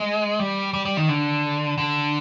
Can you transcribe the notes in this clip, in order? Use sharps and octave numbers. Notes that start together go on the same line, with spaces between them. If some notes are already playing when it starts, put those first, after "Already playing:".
Already playing: G#3
G3
G3
G3
D#3
D3
D3